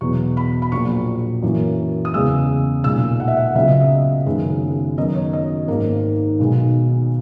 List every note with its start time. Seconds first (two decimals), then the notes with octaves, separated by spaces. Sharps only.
0.01 E2 B2 F#3 B3 C#6
0.37 B5
0.62 B5
0.72 A#1 A#2 F#3 C#6
1.42 F#2 E3 A#3
2.05 D#6
2.14 E2 C#3 G#3 B3 E6
2.84 B1 A#2 G#3 E6
3.20 F#5
3.28 E5
3.37 F#5
3.55 C#2 C#3 F#3 B3 E5
3.68 D#5
3.80 E5
4.26 F#1 F#2 D#3 G#3 B3
4.97 F#2 D#3 F#3 B3 D#5
5.15 C#5
5.33 D#5
5.68 G#1 G#2 D#3 A#3 A#4
6.40 B1 B2 G#3 B3